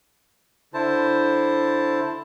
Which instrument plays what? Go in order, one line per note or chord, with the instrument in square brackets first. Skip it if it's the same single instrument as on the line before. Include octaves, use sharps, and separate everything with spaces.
[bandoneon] D3 E4 C5 A5